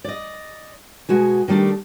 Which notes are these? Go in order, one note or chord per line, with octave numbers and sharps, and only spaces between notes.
D5 D#5
B2 G#3 F#4 G#5
D#3 G3 A3 D4 G4